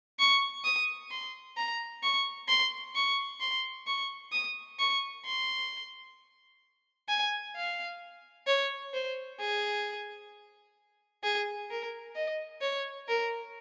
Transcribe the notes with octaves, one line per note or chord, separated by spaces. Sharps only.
C#6
D#6
C6
A#5
C#6
C6
C#6
C6
C#6
D#6
C#6
C6
G#5
F5
C#5
C5
G#4
G#4
A#4
D#5
C#5
A#4